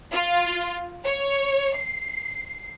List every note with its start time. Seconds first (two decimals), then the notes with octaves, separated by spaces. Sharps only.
0.12 F4
1.04 C#5
1.75 C7